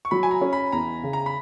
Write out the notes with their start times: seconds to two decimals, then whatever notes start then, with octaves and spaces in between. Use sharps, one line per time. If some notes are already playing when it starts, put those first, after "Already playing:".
0.05 C#6
0.11 F#3 B5
0.23 G#5
0.31 A#5
0.41 C#4
0.53 B5
0.72 E2 A#5
1.03 C#3
1.13 A#5
1.26 B5